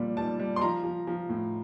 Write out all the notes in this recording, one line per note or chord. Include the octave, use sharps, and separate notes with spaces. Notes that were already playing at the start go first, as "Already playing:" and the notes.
Already playing: A#2 F3 G3
G3 A5
G3
C6
F3 A#5
F3
F3
A2